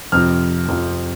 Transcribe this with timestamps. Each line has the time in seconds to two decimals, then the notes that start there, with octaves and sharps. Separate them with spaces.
0.12 F2 C3 F3 F6
0.68 F2 C3 F3